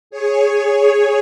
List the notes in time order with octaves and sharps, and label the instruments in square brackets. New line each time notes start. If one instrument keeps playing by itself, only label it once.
[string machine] G#4 C#5